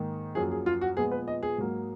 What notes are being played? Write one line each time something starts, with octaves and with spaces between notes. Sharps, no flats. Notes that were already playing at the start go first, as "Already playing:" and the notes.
Already playing: G#2 D#3 A#3
F#2 F3 A#3 G#4
G#4
F4
F#4
A#2 F3 G#3 B3 G#4
B4
D#5
G#4
G#2 F#3 A#3